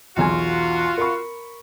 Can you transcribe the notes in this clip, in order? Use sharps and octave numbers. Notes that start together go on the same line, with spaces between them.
B1 E2 F4 F#4 G#5
A#4 B5 C#6